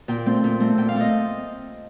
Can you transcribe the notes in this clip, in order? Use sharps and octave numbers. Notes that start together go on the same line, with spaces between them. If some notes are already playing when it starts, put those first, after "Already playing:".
A#2 G5
A3 C4
A#2
A3 C4
A#2 G5
F5
A3 C4 D#5